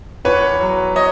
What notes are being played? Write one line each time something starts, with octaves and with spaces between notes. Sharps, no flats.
E2 B4 C#5
F#3
C#5 D#5